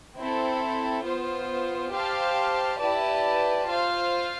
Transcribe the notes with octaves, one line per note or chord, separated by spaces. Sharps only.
C4 E4 A4
B3 F4 C5
G4 C5 F5 A5
E4 G4 B4 D5 A5
F4 C5 F5